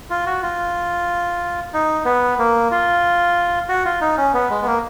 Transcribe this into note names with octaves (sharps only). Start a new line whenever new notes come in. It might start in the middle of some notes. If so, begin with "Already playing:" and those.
F4
F#4
F4
D#4
B3
A#3
F4
F#4
F4
D#4
C#4
B3
G#3
B3
A#3